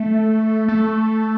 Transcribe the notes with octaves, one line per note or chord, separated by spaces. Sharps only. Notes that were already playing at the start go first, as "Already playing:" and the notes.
Already playing: A3
A3